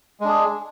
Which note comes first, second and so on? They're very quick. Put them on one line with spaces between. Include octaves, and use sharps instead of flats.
G#3 D4 G#4